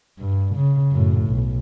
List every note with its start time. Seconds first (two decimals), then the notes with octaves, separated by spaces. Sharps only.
0.19 G2
0.55 C#3
0.92 F#2 A2
1.28 B1